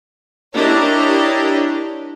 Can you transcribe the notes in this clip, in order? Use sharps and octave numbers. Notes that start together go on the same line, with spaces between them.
D4 E4 G4 A#4 C#5 D#5